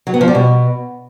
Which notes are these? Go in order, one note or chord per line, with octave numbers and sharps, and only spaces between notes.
F#3
B3
F3
G3
B2